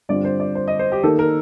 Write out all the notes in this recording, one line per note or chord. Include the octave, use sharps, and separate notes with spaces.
G2 D3 G3 C4 F4 D5
C5
D5
C5
D#5
C5
G4
D#3 A#3 D#4 A4
A#4